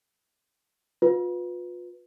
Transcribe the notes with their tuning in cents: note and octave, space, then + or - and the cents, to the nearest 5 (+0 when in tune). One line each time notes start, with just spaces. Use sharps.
F4 +35 B4 +0